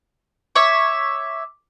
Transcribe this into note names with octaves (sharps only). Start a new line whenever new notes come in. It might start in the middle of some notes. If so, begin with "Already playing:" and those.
C#5 E5 D6